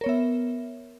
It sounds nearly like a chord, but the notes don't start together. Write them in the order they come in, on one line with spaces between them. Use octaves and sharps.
A#4 C#5 B3 E5